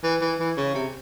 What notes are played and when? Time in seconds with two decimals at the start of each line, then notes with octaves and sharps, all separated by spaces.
0.03 E3
0.21 E3
0.39 E3
0.57 C#3
0.74 C3